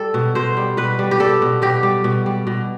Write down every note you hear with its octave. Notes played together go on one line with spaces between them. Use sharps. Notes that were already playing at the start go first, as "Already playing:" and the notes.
Already playing: G3 A4
B2
B2 C5
G3
B2 B4
G3
G4
G3 A4
B2
B2 G4
G3
B2
G3
B2